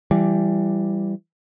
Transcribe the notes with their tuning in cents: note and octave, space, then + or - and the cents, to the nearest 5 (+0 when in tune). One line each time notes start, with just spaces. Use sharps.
E3 +25 G3 +0